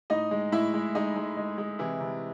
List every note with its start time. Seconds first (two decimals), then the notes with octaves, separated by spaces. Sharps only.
0.10 A2 D#4 D#5
0.31 G#3
0.52 A2 E4 E5
0.74 G#3
0.95 G#3 D#4 D#5
1.16 G#3
1.37 G#3
1.58 G#3
1.79 C3 E3 E4
2.00 C3